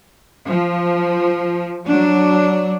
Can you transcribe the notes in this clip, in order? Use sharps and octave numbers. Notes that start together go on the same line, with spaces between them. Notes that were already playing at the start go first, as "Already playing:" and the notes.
F3
F#3 D4